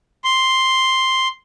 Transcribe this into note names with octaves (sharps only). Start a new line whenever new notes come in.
C6